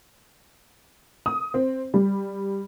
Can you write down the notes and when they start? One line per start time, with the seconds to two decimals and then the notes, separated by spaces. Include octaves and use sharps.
1.26 D#6
1.54 C4
1.94 G3